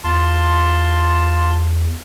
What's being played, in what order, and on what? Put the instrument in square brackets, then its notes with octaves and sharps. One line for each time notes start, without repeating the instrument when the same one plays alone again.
[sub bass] E2 [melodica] F4 A5 C6